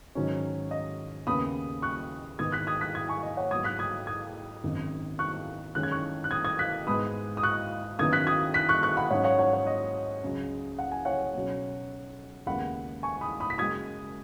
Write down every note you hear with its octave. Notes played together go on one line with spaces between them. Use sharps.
G#2 D#3 F#3 C#4
D#5
D#2 C#3 B3 B5 D#6
C#6 F#6
G#2 D#3 B3 D#6 G#6
F#6 B6
D#6 G#6
F#6 B6
D#6 G#6
G#5 C#6
D#5
C#5 F#5
G#2 F#3 B3 D#6 G#6
F#6 B6
D#6 G#6
D#6 G#6
G#1 F#2 D#3
C#6 F#6
F#2 D#3 G#3 C#4 F#6
G#6
C#6 F#6
F#6
D#6 G#6
D#6 G#6
F#6 B6
G#2 G#3 B3 B5 D#6
D#6
C#6 F#6
F#2 D#3 B3 D#6 G#6
F#6 B6
D#6 G#6
F#6 B6
C#6 F#6
C#6 F#6
F#5 B5
G#2 F#3 C#4 C#5 F#5
C#5 F#5
C#5 F#5
C#5
D#5
C#2 C#3 F#3
F#5
G#5
C#5 F#5
B1 B2 F#3 C#4
D#2 C#3 G#3 B3 F#5 B5
G#5 C#6
B5 D#6
B5 D#6
B6
F#2 C#3 G#3 D#6 G#6